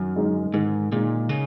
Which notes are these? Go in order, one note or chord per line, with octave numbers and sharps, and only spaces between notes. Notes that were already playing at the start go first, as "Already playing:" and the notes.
Already playing: F#2 D#3
G#3 D#4
G#2 D#3
A#2 G#3 D#4
C#3